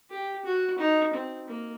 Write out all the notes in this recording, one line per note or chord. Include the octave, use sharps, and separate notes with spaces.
G4
F#4
D#4
C4
A#3